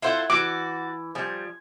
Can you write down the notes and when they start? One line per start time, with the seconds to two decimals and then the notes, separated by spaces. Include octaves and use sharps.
0.02 E4 F4 A4 C5 E5 F#5
0.30 E3 F#4 D5 D6
1.15 F3 G3 G#5